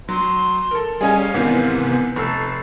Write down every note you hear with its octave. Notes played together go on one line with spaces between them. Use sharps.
F#3 C6
A4 A#4
G3 C#4 G#4 D#5 F5 G#5
G#2 C3 D#3 E3 B3
F1 A4 E6 C7